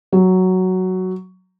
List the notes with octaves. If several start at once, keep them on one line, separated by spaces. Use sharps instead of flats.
F#3